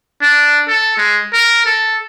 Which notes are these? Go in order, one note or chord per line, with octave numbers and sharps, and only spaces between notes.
D4
A4
G#3
A#4
A4